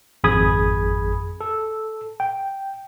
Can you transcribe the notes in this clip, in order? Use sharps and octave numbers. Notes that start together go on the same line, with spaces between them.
G#1 F2 G#4 B5 D#6 G#6
A4
G5